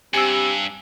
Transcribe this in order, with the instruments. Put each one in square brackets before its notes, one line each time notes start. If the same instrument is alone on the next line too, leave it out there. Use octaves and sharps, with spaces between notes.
[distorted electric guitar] G2 [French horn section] C4 G4 [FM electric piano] G#5 E6